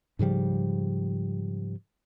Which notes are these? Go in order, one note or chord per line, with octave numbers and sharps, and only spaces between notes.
G#2 C#3 F3 G3